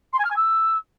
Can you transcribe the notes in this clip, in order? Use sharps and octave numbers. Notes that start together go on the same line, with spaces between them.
C6
G#5
F6
G#5
E6